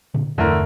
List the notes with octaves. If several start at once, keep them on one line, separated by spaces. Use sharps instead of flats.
A#2 D3
E2 G2 D3 A3 E4 A#4